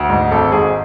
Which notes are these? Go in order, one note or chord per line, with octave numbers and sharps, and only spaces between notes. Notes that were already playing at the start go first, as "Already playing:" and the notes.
Already playing: D2
G#2
G#1 A4
G#2 G#4